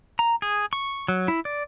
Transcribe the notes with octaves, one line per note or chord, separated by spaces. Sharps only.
A#5
G#4
C#6
F#3
E4
D5